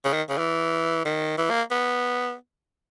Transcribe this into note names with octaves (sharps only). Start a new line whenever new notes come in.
C#3
D#3
C#3
E3
D#3
E3
A#3
B3